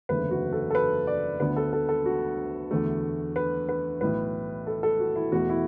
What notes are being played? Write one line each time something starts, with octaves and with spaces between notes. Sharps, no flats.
F#1 E2 D3 A3 B4
F#4
A4
A4
B4
D5
D2 D3 B3 B4
A4
A4
A4
F#4
E2 D3 A3
B4
B4
B1 A2 E3 B4
A4
A4
F#4
E4
E2 B2 A3 F#4
E4